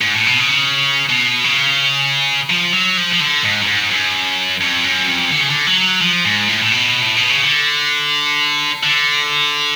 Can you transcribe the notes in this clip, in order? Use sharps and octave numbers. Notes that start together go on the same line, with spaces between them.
G#2
A2
B2
C#3
B2
C#3
F3
F#3
F3
F3
D3
G#2
F#2
G#2
F#2
F2
F#2
F2
D3
C#3
D3
F#3
F3
G#2
A2
A2
B2
A2
B2
C#3
D3
D3